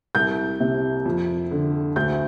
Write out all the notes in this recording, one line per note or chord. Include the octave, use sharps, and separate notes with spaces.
C2 G6
C3
F2
D3
D2 G6